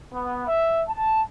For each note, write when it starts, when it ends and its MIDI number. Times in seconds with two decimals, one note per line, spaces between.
0.14 0.46 59
0.47 0.82 76
0.89 1.20 81